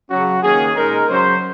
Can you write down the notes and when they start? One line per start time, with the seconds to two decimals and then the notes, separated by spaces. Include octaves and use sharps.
0.10 C#3 F#3 C#4 F#4
0.43 D#3 A#3 C#4 G#4
0.76 A#2 G#3 D#4 A#4
1.10 C#3 F#3 C#4 C5